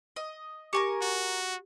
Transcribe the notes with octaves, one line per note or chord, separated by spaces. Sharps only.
D#5
G4 A#4 G#5 C#6 D6
F#4